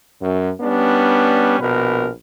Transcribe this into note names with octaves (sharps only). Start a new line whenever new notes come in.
F#2
G3 B3 C#4 D4
A#1 B2 A#4 B4